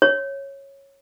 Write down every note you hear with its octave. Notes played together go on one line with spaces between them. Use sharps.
C#5